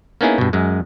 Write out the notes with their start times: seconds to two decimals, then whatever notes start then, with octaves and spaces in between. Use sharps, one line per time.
0.21 A#3 B3 C#4 D#4 E4 G#4
0.38 G2 B2
0.53 F#2 G#3